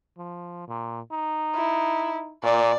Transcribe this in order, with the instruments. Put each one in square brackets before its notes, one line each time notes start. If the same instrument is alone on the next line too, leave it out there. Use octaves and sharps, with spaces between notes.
[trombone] F3
A#2
D#4
[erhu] E4
[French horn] A#2 [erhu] D5